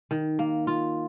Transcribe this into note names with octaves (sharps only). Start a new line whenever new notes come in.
D#3
A#3
F4